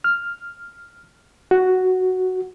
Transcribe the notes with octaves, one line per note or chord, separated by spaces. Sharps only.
F6
F#4